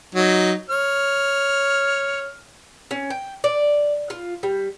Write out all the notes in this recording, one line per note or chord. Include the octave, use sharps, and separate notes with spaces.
F#3 D#4
C#5 F6
C#4
G5
D5
F4
G3